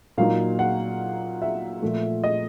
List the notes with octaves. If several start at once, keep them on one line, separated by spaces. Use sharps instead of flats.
A#2 F#3 A#3 D#4 F5
F#5
E5
A#2 F3 A3
D#5